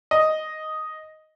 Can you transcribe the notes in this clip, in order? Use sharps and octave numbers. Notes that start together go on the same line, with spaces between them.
D#5